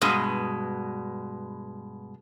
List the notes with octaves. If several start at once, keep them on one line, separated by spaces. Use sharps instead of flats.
G2 B2 G#3